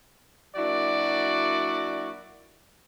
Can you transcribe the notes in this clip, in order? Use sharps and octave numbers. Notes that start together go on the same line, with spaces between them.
F#3 A#3 D4 E4 F#4 D5